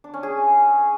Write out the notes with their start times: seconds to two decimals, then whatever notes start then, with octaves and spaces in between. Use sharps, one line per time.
0.04 D4
0.14 C#4
0.23 G#4